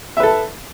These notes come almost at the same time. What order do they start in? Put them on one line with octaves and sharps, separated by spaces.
E5 B4 A4